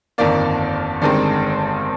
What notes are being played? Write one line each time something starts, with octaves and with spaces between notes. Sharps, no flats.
G1 F2 D#3 A#3 D5
G1 G2 D#3 G#3 C4 D5